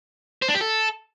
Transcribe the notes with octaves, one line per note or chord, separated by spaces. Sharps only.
C5
D4
G4
A4